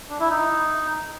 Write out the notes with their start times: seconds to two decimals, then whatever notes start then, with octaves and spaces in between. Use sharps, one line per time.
0.10 D4
0.20 E4
0.30 D#4